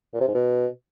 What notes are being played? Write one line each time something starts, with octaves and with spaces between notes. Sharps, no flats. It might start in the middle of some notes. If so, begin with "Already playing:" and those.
A#2
C3
G#2
B2